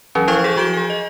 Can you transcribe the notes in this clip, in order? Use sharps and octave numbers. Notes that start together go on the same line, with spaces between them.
E3 F#3 C#4
F3 E4 C5 F5 C#6 G#6
G#4 A4 C#6 G6
F3 F#4 G6 D7 E7 G7
G#4 G#5
D#5